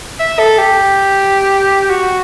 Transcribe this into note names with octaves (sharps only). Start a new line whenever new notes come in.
E5
A4
G4
F#4